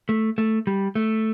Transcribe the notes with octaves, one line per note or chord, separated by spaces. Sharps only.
A3
A3
G3
A3